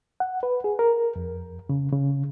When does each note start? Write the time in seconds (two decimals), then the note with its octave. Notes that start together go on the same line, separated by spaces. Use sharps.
0.20 F#5
0.43 B4
0.64 G#4
0.79 A#4
1.16 F2
1.69 C#3
1.92 C#3